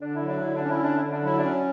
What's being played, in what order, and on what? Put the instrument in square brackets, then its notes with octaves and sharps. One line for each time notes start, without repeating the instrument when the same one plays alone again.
[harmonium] D3 [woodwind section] D4
[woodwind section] E4
[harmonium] F#3
[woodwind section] D4
[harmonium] D3 [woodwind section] E4
[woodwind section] D4
[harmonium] C#4
[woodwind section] E4
[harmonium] D3 [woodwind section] D4
[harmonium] D3 [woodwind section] E4
[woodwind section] D4
[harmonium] F#3 [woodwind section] E4
[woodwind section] D4
[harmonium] C#4